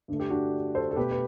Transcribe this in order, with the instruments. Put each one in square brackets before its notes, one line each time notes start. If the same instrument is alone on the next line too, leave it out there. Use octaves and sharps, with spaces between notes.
[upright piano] G2 D3 A3
G4
D4 F#4
A4 C5
A4
B2 A3 G4 B4
B4